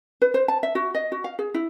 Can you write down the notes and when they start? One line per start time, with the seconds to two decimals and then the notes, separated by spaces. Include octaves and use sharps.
0.22 B4
0.34 C5
0.48 A5
0.63 E5
0.75 F#4
0.95 D#5
1.12 F#4
1.24 F5
1.39 G#4
1.54 E4